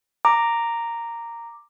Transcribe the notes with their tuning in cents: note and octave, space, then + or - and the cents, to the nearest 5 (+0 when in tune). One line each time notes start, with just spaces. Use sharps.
A#5 -5 D6 +5